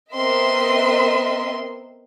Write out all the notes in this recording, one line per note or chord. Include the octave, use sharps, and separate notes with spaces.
B3 C4 A#4 D#5 E5 C6